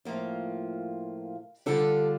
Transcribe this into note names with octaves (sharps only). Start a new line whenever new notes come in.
A2 F3 A#3 F4
D3 G3 D4 F4 A4